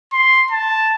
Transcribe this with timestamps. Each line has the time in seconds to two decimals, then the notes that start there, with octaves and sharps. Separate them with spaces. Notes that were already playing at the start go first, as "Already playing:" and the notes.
0.13 C6
0.51 A5